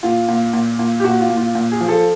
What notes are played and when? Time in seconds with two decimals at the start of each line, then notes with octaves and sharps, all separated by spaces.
0.03 A#2 F4
0.29 A#2
0.53 A#2
0.79 A#2
1.00 G4
1.04 A#2 F#4
1.21 F4
1.30 A#2
1.37 F4
1.55 A#2
1.72 G#4
1.81 F3
1.89 A4